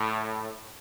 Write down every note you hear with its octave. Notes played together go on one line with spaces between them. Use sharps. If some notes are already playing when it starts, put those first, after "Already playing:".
Already playing: A2